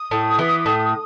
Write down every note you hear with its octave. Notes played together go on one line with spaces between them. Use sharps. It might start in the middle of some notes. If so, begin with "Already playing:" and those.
Already playing: D#6
A2
E3 B3
A2